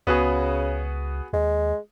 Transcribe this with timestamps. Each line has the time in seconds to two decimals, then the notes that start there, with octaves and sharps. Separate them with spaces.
0.07 C#2 C#3 B3 F#4 G#4
1.33 D#2 G#3